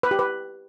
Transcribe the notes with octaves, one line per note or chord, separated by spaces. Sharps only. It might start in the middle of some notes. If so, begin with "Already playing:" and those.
B4
G4
B4